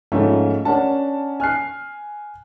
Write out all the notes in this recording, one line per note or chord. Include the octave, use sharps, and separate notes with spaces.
G#2 F3 A3 A#3 C#4 F4
C#4 D4 A#4 F#5 A5
G#5 F6 F#6 C7